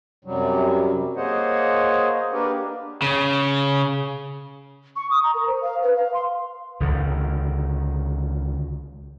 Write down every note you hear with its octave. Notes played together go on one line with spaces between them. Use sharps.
F#2 C3 F#3 G3
A#3 G#4 C5 C#5 D#5 F#5
A#3 D4 G4 A#4 B4
C#3
C#6
D#6
A#5
A#4
C5
F5
B4
F5
C6
C#2 D3 D#3